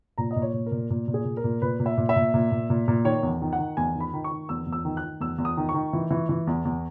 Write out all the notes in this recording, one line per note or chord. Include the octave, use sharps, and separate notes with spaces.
A#2 A#5
D#5
A#2
C#5
A#2
A#4
A#2
A#2
A#2
G#4
A#2
A#4
A#2
A#2 B4
A#2
E5
A#2
E5
A#2
A#2
A#2
A#2
A#2
D#3 C#5
E2
D#3
F#5
D#3
E2 G#5
D#3
B5
D#3
C#6
D#3
E2 E6
E2
E6
D#3
F#6
D#3
E2 E6
E2
D#6
D#3
C#6
D#3
E3
E3
E3
E2
E2